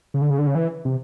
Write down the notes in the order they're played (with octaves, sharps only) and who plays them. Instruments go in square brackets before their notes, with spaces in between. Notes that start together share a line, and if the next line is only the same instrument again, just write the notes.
[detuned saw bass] C#3
D3
C#3
D3
C#3
E3
C3